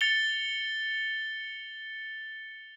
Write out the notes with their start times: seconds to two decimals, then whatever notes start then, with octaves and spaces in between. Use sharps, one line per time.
0.01 A6 C#7 F7 G7